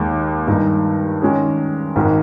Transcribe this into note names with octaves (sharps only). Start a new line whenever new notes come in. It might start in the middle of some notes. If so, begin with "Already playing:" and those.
Already playing: D#2 D#3 G#3
G2 D#3 G#3 D#4
D#3 G#3 C#4 G#4
G#1 G#2 D#3